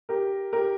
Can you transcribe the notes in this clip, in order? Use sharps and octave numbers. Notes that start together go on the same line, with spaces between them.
G4 A#4
G4 A#4